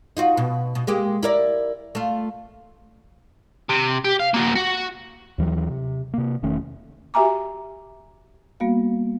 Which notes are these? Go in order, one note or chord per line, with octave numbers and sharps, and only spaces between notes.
D#4 F4 F#4
B2
B2
G#3 A#3 G4
E4 A#4 D5
A3 F4
C3
G4
F5
A#3 F#4
F#4
D#2 E3 F#3
C3
C3 A#3
E1 D#3 A3 C#4
F#4 G4 E5 G#5 A#5 D6
G3 A#3 B3 F#4 F5